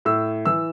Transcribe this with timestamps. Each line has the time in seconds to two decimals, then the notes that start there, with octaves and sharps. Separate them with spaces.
0.05 A2 E6
0.45 E3 E6